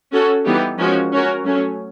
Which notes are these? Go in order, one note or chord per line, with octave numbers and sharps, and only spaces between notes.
C#4 F#4 A4
E3 G3 B3 D#4 G4
F3 G#3 C#4 F#4 A#4
C#4 F#4 A#4
F#3 A3 C#4